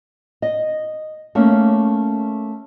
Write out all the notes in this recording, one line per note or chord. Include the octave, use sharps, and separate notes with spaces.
D#5
A3 A#3 C#4